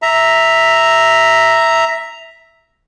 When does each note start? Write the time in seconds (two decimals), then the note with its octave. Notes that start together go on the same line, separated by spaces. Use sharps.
0.02 E5 A#5